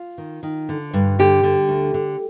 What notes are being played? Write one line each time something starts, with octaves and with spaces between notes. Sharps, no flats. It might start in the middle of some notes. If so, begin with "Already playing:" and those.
Already playing: F4
D#3
D#3
D3
G2
D3 G4
D3
D2
D3